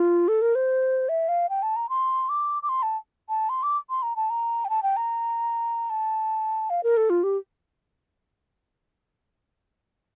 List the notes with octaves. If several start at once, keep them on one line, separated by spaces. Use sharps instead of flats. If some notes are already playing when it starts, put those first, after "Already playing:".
Already playing: F4
A4
A#4
C5
E5
F5
G5
A5
A#5
C6
D6
D6
C6
A5
A5
C6
D6
C6
A#5
A5
A#5
G5
A5
G5
A#5
A5
F5
A#4
A4
F4
G4